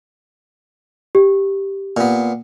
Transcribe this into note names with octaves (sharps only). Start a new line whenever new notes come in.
G4
A#2 B3